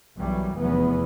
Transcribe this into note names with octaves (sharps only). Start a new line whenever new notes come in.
B1 F#2 E3 F#3 G3
F1 E2 F#3 B3